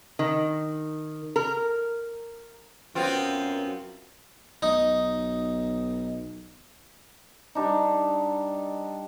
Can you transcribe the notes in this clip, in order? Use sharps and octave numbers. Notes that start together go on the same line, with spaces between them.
D#3
A#4
F#2 B3 C4 F4
B1 D#4
G3 D4 D#4